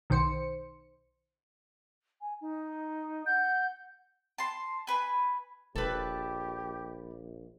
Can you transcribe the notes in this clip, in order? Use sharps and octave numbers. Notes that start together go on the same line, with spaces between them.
B1 D#3 C5 C#7
G#5
D#4
F#5 G6
A5 C6
B4 G#5
E1 A#1 G4 A4 B4